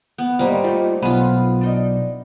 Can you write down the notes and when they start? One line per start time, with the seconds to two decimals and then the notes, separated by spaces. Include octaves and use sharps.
0.18 B3
0.39 G#2 G3 A#3 C5 D#5
0.64 A3 C4 D#4 F4
1.02 B1 B3 F4 G#5 B5
1.61 D4 D#4 D5